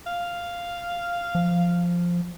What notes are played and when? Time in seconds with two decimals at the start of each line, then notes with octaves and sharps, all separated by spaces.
0.07 F5
1.35 F3